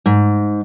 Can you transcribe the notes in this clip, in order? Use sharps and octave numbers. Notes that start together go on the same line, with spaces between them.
G#2